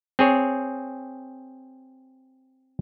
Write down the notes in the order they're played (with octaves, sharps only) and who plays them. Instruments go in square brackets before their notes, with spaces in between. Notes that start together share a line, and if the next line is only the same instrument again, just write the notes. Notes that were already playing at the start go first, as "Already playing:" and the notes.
[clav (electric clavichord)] C4 G#4 C#5